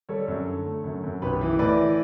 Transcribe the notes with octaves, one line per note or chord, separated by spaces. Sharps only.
G3 A4 C#5
F#2
D3
A3
F#2
F#2
B1 G4 B4
E3
A2 B4 D5
E3